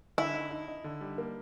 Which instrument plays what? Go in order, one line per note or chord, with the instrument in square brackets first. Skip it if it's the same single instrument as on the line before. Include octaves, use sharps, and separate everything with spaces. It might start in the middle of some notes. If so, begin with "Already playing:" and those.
[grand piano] D3 [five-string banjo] E4
[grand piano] D#4
D#4
D#4
D3
G3
A#3